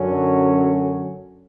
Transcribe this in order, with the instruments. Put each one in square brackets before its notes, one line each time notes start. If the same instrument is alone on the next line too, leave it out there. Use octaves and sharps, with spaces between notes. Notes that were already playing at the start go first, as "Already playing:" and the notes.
Already playing: [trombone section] F#2 D3 F#3 C#4